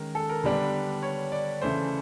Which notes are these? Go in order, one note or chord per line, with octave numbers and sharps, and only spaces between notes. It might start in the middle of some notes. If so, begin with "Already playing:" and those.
Already playing: D#3 G#3 C#4 A#4
A4
A#4
D3 G3 B3 D4
C#5
D5
C#3 E3 A3 C5